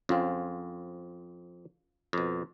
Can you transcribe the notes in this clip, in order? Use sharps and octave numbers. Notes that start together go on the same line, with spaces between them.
F2 C4 C#4 F4
F2 B2